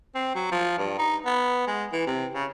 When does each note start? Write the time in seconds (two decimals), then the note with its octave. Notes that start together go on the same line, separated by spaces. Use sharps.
0.15 C4
0.35 F#3
0.51 F3
0.78 G2
0.98 D#4
1.26 B3
1.67 G#3
1.92 E3
2.06 C3
2.34 C#3